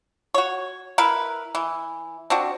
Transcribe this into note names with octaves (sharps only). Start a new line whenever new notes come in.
F#4 C#5
E4 A#4 B4
E3
C4 D4 F#4